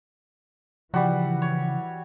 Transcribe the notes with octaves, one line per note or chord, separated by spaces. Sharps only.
C#3 E3 F3 G3 F#4
C#5